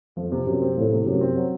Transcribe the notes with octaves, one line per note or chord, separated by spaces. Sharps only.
F2 F3
C3
F#2 C3
C4
A2 F3
C3
F#2 C3
C4
F#3